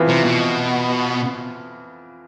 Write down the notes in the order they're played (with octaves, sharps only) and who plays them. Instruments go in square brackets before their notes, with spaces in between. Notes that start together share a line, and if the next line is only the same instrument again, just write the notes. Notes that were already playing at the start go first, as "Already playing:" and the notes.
Already playing: [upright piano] F2 E3 B3 F4
[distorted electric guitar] C3
B2